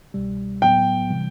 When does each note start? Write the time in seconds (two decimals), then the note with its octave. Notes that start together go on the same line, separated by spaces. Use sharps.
0.14 C2 B2 G3
0.62 A2 F#3 B3 G5
1.10 C3 E3 G3